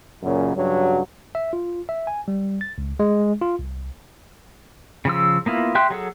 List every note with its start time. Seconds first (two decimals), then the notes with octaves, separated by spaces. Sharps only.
0.22 F#2 A#2 C#3 F#3
0.55 G2 C#3 F#3
1.35 E5
1.53 F4
1.89 E5
2.07 G#5
2.28 G3
2.61 A6
2.78 C#2
3.00 G#3
3.41 F4
3.59 C2
5.05 C#3 F3 E6
5.46 A#3 B3 E4 F4
5.75 G4 E5 G5 C6 F#6
5.90 F#3 G#4 A4